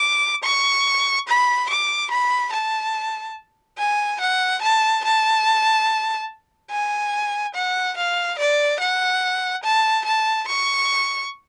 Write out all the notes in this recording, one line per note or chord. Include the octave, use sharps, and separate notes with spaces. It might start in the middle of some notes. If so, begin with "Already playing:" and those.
Already playing: D6
C#6
B5
D6
B5
A5
G#5
F#5
A5
A5
G#5
F#5
F5
D5
F#5
A5
A5
C#6